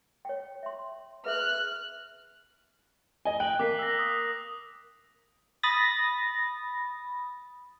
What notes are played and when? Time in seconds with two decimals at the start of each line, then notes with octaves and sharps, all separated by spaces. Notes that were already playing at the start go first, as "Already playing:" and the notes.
0.25 C#5 G5
0.63 E5 C6
1.25 G#4 B4 E5 F6 F#6
3.25 D#5 G#5 G7
3.40 G5 F#6 F#7
3.59 A#3 D6 B6 C7
3.79 E6 A#6
3.99 D#6
5.63 B5 D#6 A6 A#6